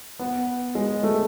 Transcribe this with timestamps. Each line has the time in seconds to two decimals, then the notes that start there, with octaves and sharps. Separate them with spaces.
0.19 B3
0.75 G#3
1.03 A3